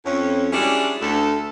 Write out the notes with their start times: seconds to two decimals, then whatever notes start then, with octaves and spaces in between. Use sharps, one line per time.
0.05 F2 C#4
0.53 G3 G#3 C#4 D4 E4 F#4
1.01 D2 A4